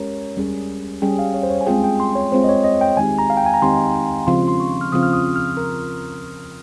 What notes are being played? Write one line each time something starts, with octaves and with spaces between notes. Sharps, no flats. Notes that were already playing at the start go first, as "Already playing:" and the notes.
Already playing: G#3 C#4 G4 A#4 C#5
G3 C#4 G#4
G3 C#4 G#4 G5
F5
C#5
C5
C#5
G#5
G#3 C4 F4 G#4 G5
G5
C6
C#5
G#3 C4 F4 G#4 C5
D#5
C#5
D#5
G5
D#3 G#3 C4 D#4 G4 G#5
A#5
F5
G5
G#5
A#5
D#3 G#3 C4 D#4 G4 C6
C#3 F3 C4 F4 C6
C6
C#6
F6
C#3 F3 C4 F4 D#6
F6
D#6
F6
A#4